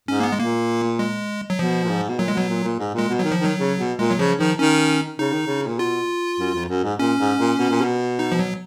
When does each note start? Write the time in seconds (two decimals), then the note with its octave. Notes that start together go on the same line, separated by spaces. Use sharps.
0.08 G#2 C#4
0.20 A#3
0.23 B3
0.32 G#3
0.39 A#2 A#3
0.99 G#3
1.50 F#3
1.59 B2 F3
1.84 A#2
1.89 G#2
2.09 B2
2.19 A#2 F#3
2.28 G#3
2.34 B2 F#3
2.49 A#2
2.64 A#2
2.79 G#2
2.94 A#2 G#3
3.09 B2
3.19 D#3 F#3
3.31 F3
3.39 D#3
3.45 F#3
3.59 C#3
3.79 B2
3.99 A#2 G#3
4.10 F#3
4.19 C#3 F3
4.39 D#3 F3
4.59 D#3 C#4
5.19 C#3 D#4
5.33 D#3
5.46 C#3
5.67 A#2
5.79 B2 F4
6.39 F#2
6.54 F2
6.69 F#2
6.84 G#2
6.99 A#2 C#4
7.19 G#2
7.39 A#2
7.59 B2
7.70 A#2
7.82 B2
8.19 D#4
8.32 F3
8.39 F#3